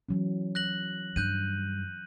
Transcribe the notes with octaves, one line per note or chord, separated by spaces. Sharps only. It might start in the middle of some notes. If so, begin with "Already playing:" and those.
E3 F#3 C#4
F#6 A#6 F#7
G2 F#6 G6 D#7